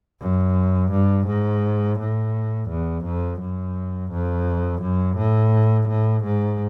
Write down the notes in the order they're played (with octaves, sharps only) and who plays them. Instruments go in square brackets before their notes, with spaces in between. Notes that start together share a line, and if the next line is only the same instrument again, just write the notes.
[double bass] F#2
G2
G#2
A2
E2
F2
F#2
F2
F#2
A2
A2
G#2